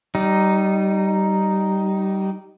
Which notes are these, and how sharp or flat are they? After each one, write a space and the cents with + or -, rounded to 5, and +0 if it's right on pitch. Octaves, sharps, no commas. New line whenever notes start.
G3 -20 D#4 +0